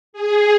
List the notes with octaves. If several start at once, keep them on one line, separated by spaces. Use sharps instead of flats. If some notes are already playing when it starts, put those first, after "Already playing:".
G#4